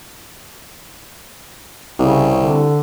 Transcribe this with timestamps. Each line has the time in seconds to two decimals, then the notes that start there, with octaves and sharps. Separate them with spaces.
1.99 C2 C#3
2.38 D3